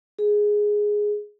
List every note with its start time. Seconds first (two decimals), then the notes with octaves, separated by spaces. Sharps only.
0.19 G#4